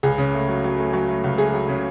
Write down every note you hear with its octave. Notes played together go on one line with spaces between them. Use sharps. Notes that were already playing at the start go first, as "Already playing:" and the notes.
C#2 G#4
C#3
A3
F#3
F#3
A3
F#3
A3
C#2
A3 G#4
F#3
C#3